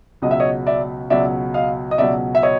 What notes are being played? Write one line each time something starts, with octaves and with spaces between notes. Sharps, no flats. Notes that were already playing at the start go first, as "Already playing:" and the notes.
C#2 B2 F#3 D#5
E5
C#5 D#5
D5 E5
C#2 B2 F#3 D5 E5
D#5 F5
D#5
C#2 B2 F#3 D5 E5
E5
C#5 D#5